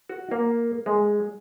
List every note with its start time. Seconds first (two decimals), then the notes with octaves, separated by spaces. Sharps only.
0.09 F#4
0.31 A#3
0.86 G#3